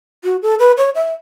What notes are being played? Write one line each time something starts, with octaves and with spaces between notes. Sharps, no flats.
F#4
A4
B4
C#5
E5